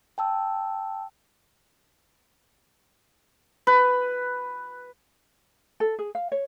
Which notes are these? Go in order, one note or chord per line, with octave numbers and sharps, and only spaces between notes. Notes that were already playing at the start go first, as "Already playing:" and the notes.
G5 A5 E6
B4
A4
G#4
F5
C#5